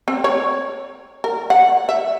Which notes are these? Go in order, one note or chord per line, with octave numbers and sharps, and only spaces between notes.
C4
C#5
A#4
F#5
E5